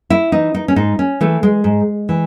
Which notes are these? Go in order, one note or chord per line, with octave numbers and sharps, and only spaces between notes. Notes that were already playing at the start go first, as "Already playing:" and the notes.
E4
E3 D#4
D#4
C#4
G#2 D#4
C#4
E3 A3
G#3
G#2
E3